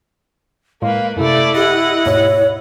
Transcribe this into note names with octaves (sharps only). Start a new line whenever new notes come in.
A2 G#3 A#3 B4 F5
F#2 C3 A3 E4 D5
G4 D#5 F#5
D#2 G#2 B2 C#5